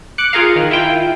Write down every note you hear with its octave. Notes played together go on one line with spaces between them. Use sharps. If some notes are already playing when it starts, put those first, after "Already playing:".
D6 F#6 C#7
F4 G#4 A#4 F5
D#3
E4 F4 G5